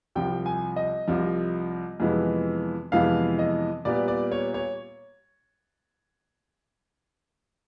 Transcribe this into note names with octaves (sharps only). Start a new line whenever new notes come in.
C2 C3 F3 G5
G#5
D#5
C2 C3 F3
F2 C3 E3 G#3 B3
F2 C3 E3 G#3 B3 F5
D#5
A#2 G3 B3 D5
D5
C#5
C#5